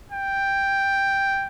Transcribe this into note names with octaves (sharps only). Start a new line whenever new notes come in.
G5